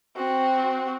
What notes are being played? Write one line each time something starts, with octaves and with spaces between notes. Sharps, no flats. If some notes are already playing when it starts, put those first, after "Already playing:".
C4 F#4